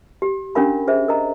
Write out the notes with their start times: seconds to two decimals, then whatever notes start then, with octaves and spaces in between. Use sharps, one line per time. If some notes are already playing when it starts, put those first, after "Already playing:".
0.22 G4
0.55 C#4 D4 G4 A#4 F5 B5
0.88 G#4 C5 E5
1.08 A#4 D#5 A#5